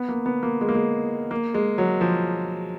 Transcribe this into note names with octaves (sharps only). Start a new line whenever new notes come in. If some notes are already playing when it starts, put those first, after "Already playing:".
Already playing: B3
A#3
B3
A#3
G#3
A#3
G#3
A#3
G#3
F#3
F3